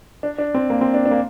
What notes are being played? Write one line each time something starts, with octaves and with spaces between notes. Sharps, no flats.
D4
D4
C4
A#3
C4
D4
D4
A#3